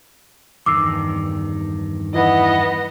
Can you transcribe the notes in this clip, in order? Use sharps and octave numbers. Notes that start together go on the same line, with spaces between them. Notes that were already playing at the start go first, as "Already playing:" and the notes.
E2 G2 D#3 D6 E6 C7
E3 B3 D#5